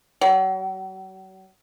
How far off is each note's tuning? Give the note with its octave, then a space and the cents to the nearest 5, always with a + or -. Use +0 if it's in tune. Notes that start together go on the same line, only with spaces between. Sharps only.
F#3 +40